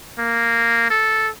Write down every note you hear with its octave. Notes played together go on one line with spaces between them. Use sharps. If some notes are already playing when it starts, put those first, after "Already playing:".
A#3
A4